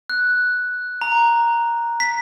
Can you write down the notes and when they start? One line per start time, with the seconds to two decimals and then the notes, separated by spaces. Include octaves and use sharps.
0.10 F#6
1.01 A#5
2.00 B6